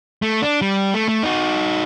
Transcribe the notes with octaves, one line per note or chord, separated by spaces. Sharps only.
A3
D4
G3
A3
A3
D#4 F#4